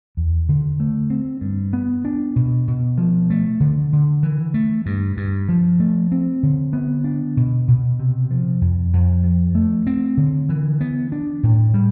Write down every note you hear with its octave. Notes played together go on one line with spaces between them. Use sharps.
E2
D3
A3
C4
G2
B3
D4
B2
B2
F3
A3
D3
D3
E3
A3
G2
G2
F3
A3
C4
D3
B3
D4
B2
B2
C3
F3
F2
F2
F3
A3
C4
D3
E3
B3
D4
A2
G3